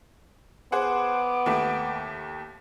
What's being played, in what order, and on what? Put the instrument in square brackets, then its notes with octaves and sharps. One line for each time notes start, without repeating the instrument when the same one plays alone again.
[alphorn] B3 [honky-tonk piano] G#4 C5 F#5 [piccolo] D6
[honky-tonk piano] D#2 A3